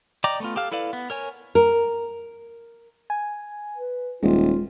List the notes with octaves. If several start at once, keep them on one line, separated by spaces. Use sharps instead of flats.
D5 D#5 G5 A#5 D6
A3 B3 F4
G4 A4 F5 F6
E4 A4 B4 D5 F5
B3
A#4 C#5 G#5
A#4
G#5
B4
D#1 G#3 F4